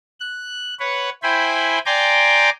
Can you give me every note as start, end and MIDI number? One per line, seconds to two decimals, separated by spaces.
0.20 0.74 90
0.79 1.09 71
0.79 1.09 73
0.79 1.09 78
1.23 1.79 64
1.23 1.79 72
1.23 1.79 79
1.23 1.79 80
1.23 1.79 83
1.86 2.50 74
1.86 2.50 79
1.86 2.50 80
1.86 2.50 82
1.86 2.50 84
1.86 2.50 86